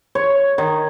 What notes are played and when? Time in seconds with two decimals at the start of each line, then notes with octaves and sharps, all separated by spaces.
0.15 C#5
0.58 D#3